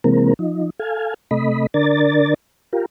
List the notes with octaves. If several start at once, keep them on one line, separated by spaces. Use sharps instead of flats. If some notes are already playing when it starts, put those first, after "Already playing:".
C3 E3 G#3 A#3 C4 A#4
F3 D#4
A4 F5 G#5
C3 A3 D#5 B5
D3 D4 A#4 D5 A6
F4 G4 A#4